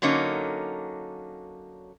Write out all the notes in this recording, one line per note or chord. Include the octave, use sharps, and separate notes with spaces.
D3 F#3 A#3 C#4 D#4